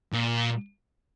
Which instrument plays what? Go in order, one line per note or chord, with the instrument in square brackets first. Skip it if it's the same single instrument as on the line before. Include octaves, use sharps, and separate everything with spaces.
[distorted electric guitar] A#2